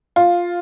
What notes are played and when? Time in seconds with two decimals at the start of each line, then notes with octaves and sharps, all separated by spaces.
0.16 F4